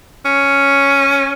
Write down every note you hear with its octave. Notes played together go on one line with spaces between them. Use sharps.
C#4